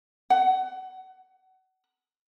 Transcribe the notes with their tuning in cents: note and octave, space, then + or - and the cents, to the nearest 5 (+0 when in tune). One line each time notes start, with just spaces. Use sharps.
F#5 +25